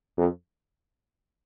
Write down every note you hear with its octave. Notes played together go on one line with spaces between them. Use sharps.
F2